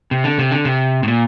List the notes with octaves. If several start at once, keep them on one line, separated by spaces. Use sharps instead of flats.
C3
D3
C3
D3
C3
A2
A#2